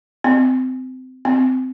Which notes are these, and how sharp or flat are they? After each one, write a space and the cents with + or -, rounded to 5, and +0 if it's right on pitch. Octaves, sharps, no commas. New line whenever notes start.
C4 -25
C4 -20